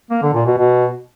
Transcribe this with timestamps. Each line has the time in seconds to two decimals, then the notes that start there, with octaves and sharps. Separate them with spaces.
0.11 A#3
0.22 D3
0.34 A#2
0.46 B2
0.57 B2